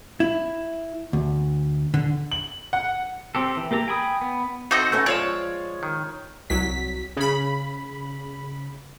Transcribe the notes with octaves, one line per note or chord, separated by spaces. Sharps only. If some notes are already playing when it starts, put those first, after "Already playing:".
E4
D2
D3
F#7
F#5
C4 G4 A4
E3
A#3 G4 A4 A#5
G5 G#5 B5 D#6
B3
C4 D#4 F#4 A4 D#5
A3 C#4 A4 B4
F3 G#3 C#5 D5 F5 A5
D#3
C2 F#3 B6
C#3 B5